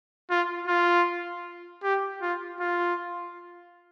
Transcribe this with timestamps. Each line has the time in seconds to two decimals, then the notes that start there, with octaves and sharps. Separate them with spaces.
0.31 F4
0.68 F4
1.83 G4
2.22 F4
2.60 F4